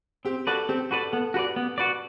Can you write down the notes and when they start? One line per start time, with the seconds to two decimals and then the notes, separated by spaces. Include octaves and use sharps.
0.25 C4 G4
0.47 F#4 A4 B4 D5
0.69 C4 G4
0.91 F#4 A4 B4 D5
1.12 B3 A4
1.34 F#4 G4 B4 D5
1.56 B3
1.78 F#4 B4 D5